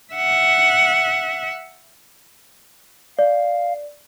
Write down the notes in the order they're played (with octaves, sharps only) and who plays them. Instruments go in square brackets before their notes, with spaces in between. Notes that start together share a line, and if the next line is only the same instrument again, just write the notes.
[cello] E5 F#5
[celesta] D5 [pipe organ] F5